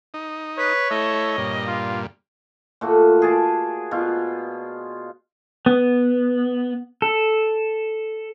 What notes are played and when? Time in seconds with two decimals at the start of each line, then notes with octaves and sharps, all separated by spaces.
0.14 D#4
0.58 B4 C#5
0.91 A3 E4 D#5
1.38 G2 A#2
1.67 F4
2.81 A#2 A3 F#4
3.22 G#4 D5 A5
3.91 B2 F4
5.66 B3
7.02 A4